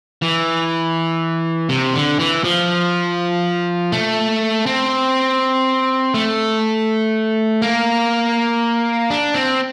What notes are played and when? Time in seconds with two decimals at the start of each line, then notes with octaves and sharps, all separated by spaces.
0.22 E3
1.69 C3
1.94 D3
2.19 E3
2.44 F3
3.92 A3
4.66 C4
6.14 A3
7.62 A#3
9.10 D4
9.34 C4